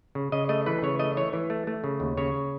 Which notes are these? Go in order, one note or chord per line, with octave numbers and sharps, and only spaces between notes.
C#3
C#3 D#5
A3 D#5
E3 B4
C#3 C#5
A3 D#5
E3 C#5
E3
A3
A3
C#3
D#2
C#3 C#5